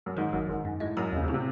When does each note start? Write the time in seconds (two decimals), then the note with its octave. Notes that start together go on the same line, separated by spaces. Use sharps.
0.06 F#2
0.17 G#2 D#3
0.33 G#1 F#2
0.48 G#1 G#2
0.65 F#2
0.80 A2 G#3
0.97 F#2 D#4
1.13 D#2 C#3
1.23 C3
1.28 A2 C#3
1.34 C3